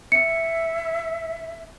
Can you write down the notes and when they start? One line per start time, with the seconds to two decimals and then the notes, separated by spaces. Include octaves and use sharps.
0.12 E5 C#7